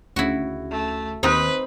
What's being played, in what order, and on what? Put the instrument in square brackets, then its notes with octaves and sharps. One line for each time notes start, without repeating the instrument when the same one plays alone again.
[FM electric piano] D2 C#3 [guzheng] E4 F#4
[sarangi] A3
[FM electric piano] D#2 [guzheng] C4 D#4 [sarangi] B4